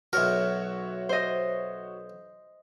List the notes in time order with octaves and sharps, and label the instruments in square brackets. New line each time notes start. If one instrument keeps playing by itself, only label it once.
[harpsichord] B1 A#4 [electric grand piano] F#4 C#5 E5
[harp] C5 D#5